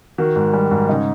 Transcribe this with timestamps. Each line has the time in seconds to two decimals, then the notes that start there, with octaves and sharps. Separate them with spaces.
0.18 D#3 F#4
0.36 G#2
0.53 G3
0.71 G#2
0.89 C#3 D#4